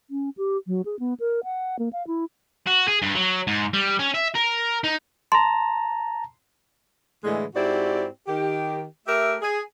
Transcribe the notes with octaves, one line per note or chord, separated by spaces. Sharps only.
C#4
G4
F#3
G#4
B3
A#4
F#5
A#3
F5
E4
F#4
G#4
G2
F#3
G#2
G3
C#4
E5
A#4
D#4
A5 A#5 C6
A2 D3 E3 G#3
G#2 C4 E4 F#4 G4 D5
D#3 G4
A3 G4 A#4 E5
G#4